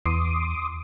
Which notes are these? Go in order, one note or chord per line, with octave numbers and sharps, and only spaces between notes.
E2 C6 D6 D#6